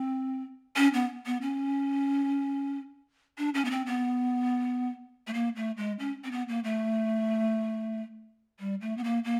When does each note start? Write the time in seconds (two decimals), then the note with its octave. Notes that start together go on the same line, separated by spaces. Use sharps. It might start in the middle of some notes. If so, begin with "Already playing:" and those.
Already playing: C4
0.77 C#4
0.94 B3
1.26 B3
1.42 C#4
3.38 D4
3.54 C#4
3.65 B3
3.71 C4
3.86 B3
5.27 A3
5.34 A#3
5.56 A3
5.77 G#3
5.99 C#4
6.24 C4
6.32 B3
6.48 A#3
6.64 A3
8.60 G3
8.81 A3
8.97 B3
9.04 A#3
9.25 A#3